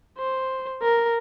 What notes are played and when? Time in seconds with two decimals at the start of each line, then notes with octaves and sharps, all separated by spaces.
0.18 C5
0.82 A#4